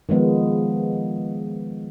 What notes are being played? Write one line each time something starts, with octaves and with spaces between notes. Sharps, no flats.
D#3 F3 G#3 B3